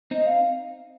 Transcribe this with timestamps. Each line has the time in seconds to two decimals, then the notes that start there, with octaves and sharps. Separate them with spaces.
0.11 C4 D#4 D#5
0.27 F5